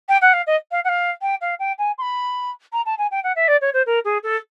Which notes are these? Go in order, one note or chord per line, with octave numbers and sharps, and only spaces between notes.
G5
F#5
F5
D#5
F5
F#5
F5
G5
F5
G5
G#5
C6
B5
A#5
A5
G#5
G5
F#5
E5
D5
C#5
C5
A#4
G#4
A4